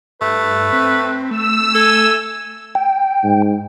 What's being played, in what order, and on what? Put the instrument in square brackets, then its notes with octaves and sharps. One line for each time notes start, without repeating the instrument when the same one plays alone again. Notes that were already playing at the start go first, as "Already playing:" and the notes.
[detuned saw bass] G2 [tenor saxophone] A3 [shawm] B4
[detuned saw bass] C4
[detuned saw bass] A3 [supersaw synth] E6
[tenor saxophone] A4 [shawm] G#5
[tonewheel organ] G5
[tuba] G#2